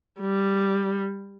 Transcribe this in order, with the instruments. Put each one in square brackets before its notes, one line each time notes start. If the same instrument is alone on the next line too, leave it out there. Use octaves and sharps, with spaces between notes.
[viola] G3